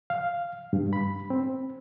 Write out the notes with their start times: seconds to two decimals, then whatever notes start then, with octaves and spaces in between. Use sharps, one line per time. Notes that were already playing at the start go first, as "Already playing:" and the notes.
0.10 F5
0.73 G2
0.93 B5
1.30 C4